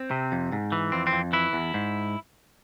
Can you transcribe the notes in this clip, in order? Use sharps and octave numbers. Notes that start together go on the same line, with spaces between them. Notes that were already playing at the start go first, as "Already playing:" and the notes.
Already playing: C4
C3
F2
G#2
E3
F2 C4
C4
F2
E3 E4
E2
G#2